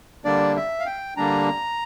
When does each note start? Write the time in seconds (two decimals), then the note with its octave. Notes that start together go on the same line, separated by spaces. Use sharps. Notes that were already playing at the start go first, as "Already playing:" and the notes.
0.25 D3 G3 A#3 D4 D5
0.57 E5
0.80 F5
0.86 G5
1.17 D3 G3 A#3 D4 A#5